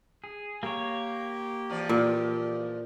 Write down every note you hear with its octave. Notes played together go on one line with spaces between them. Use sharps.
G#4
A#3 G4 C#5
E2 F3 D5
A#2